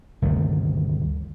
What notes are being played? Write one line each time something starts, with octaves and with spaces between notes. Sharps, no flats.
G1 D2 C3 D#3